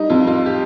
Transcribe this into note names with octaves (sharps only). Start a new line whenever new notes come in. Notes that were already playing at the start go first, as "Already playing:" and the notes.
Already playing: G3 D#4
F2 F4
F4
G4